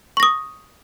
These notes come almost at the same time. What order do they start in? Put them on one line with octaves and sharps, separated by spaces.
C#6 A#6 D#6